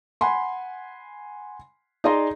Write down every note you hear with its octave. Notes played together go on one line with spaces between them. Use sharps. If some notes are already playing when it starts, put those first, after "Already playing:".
F#5 G#5 B5 C6
D#4 G#4 D5 D#5 A#5 C6